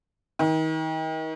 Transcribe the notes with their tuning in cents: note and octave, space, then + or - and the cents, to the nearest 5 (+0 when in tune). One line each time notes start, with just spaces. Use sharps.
D#3 +35